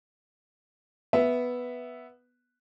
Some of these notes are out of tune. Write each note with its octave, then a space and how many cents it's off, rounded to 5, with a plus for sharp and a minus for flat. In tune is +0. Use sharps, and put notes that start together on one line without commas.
B3 +0 E5 +0